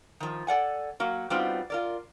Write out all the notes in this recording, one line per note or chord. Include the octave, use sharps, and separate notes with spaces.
D#3 F3
A4 D5 F#5 G#5
F#3 A#3 F#4
G3 B3 C4 D#4 F4 F#4
F4 A#4 D5